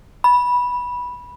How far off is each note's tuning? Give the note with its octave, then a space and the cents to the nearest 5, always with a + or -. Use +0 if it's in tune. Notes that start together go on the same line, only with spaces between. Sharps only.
B5 -10